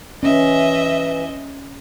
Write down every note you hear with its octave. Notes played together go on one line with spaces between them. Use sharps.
E3 C#4 D#5 E5